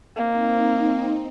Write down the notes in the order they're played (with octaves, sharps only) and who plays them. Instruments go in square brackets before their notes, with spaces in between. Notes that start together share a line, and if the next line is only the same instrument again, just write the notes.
[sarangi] A#3 [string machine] C4 D#4